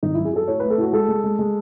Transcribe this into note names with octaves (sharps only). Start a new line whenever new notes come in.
G#1 D#4
F#2 E4
G#4
F#3 A4
A2 C#5
A3 B4
A4
A2 F#4
G#3 A4
G#3
G#3
G#3